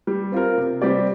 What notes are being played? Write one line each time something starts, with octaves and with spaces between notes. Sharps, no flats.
G3
C4 F4 A#4
C3
G3 C4 G4 D5